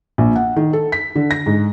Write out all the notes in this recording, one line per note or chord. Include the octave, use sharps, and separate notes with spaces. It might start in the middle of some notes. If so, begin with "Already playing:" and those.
A#1
F#5
D#3
A4
B6
D3
A#6
G#2